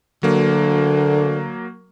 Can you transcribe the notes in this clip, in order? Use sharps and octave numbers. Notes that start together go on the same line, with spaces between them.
D2 D3 F#3 A#3